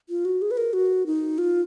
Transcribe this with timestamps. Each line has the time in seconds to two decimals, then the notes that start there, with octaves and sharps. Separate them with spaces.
0.09 F4
0.25 F#4
0.42 G#4
0.51 B4
0.57 A#4
0.73 F#4
1.06 D#4
1.38 F4